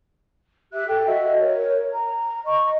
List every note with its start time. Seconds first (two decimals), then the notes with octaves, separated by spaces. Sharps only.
0.72 G4 E5 F#6
0.88 A4 G5
1.06 F#4 D#5 E5
1.40 A#4 C#5
1.92 A#5
2.45 D#5 C#6